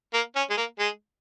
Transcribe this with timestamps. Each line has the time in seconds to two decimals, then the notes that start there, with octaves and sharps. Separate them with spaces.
0.14 A#3
0.36 C#4
0.50 G#3
0.57 A#3
0.79 G#3